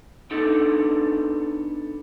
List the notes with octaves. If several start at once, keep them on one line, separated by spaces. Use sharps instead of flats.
B3 D4 D#4 A4